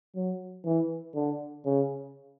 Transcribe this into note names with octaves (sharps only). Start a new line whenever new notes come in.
F#3
E3
D3
C#3